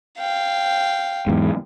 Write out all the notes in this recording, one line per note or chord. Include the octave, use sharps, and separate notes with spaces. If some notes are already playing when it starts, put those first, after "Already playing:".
F5 G5
E2 G#2